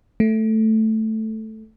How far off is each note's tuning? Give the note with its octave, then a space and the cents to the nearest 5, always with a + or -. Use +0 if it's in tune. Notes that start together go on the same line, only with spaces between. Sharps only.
A3 +0